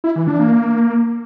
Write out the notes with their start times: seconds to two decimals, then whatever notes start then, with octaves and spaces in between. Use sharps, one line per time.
0.04 E4
0.16 E3
0.28 D4
0.39 A#3